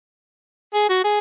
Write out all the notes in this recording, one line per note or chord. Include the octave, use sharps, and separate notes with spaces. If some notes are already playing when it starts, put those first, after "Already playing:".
G#4
F#4
G#4